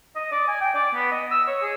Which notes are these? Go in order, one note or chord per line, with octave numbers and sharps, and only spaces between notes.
D#5
D5
G#5
G5
D5
B3
D#5
E6
C#5
G#4